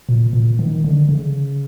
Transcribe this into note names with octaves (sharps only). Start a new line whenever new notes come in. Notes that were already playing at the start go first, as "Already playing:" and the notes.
A#2
A#2
D#3
D3
C#3